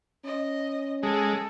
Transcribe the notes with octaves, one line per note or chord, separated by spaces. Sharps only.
C#4 D#5
G#3 A4